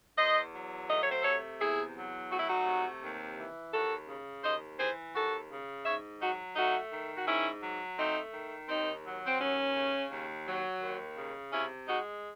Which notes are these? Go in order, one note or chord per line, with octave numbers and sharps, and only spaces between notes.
E2 C5 D#5
F#3
A3 D#5
C#5
C5
C3 A4 C#5
E2 E4 G#4
F#3
A3 F#4
E4
D#4 F#4
C3
D#2
E3
D#2 F#4 A4
C#3
D#2 C5 D#5
E3 G#4 C5
D#2 F#4 A4
C#3
G#2 C#5 E5
F#3 D#4 F#4
A3 D#4 F#4
D#3
F#4
G#2 C#4 E4
F#3
A3 C4 D#4
D#3
D#2 C4 D#4
F#3
C4
D#2 C#4
C#3
D#2
F#3
D#2
C#3
C3 C#4 E4
G#3 D#4 F#4